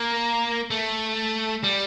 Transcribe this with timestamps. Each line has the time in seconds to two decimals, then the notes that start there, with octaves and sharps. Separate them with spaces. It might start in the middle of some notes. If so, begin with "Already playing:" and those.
Already playing: A#3
0.70 A3
1.64 G3